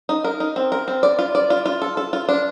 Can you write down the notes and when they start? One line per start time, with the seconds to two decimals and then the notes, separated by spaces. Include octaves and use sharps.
0.09 D#4
0.24 A#4
0.40 D#4
0.56 C4
0.72 A#4
0.88 C4
1.03 D5
1.19 F4
1.35 D5
1.50 F4
1.66 F4
1.82 A4
1.97 A4
2.13 F4
2.29 D4